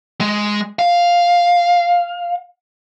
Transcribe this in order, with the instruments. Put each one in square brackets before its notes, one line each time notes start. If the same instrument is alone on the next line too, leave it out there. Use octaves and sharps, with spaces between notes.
[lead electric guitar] G#3
F5